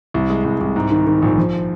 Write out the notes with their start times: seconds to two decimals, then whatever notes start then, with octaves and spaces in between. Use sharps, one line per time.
0.14 C2
0.30 G#3
0.44 C2
0.61 C2
0.76 G#2
0.91 D#3
1.07 D#3
1.22 A#1
1.38 F3